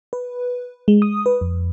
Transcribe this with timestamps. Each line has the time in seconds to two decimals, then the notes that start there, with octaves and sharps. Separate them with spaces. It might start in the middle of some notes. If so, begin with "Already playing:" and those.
0.13 B4
0.88 G#3
1.02 D#6
1.26 B4
1.41 F2